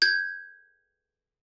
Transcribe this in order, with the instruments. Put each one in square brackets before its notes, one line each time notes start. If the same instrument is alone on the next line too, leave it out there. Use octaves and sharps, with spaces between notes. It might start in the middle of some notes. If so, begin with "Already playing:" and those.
[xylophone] G6 G#6